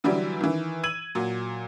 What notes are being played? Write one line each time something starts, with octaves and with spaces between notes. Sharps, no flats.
D3 E3 F#3 G3
D#3 E3
E6 G#6 D#7 F#7
A#2 F#3